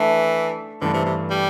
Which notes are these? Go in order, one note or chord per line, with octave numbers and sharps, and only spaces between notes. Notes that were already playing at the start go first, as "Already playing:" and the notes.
Already playing: E3 A3 D4 A4 E5
G2 D3 E3 A3 D4
C3
C3
G3